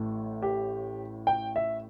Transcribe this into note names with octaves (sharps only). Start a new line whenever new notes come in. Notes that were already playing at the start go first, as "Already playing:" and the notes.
Already playing: A1 A2 A3
G4
G5
E5